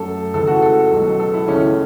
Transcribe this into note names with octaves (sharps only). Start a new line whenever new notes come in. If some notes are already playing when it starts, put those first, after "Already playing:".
Already playing: F#2 F#3 A3 A4
C#2 C#3 E3 A3 A4
F#4
A4
C#2 B2 F#3
A4
E4
C#2 C#3 A3 C#4